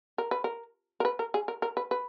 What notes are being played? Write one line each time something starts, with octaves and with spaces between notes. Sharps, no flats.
A#4
B4
A#4
A#4
B4
A#4
G#4
A#4
A#4
B4
B4